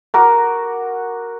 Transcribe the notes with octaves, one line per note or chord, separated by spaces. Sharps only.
F#4 A#4 D6